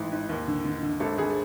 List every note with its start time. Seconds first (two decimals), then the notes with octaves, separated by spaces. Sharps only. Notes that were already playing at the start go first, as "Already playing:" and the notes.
Already playing: A1 G#2 E3
0.12 G#2
0.29 D#2
0.48 D3
0.65 D3
0.83 D3
1.00 G#1 A4
1.18 G#1 G#4